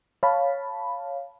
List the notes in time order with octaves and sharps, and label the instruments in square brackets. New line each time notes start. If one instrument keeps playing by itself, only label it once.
[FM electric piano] C#5 F5 A5 B5